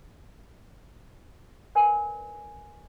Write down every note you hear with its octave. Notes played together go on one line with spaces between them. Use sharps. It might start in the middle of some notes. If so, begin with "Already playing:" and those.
A#4 B4 D5 G#5